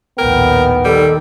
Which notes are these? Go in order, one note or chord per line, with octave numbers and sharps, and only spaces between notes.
A#1 D#2 A2 B3 A#4 G5
D#3 G3 A4